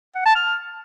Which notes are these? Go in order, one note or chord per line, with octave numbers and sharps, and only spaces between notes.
F#5
A5
F6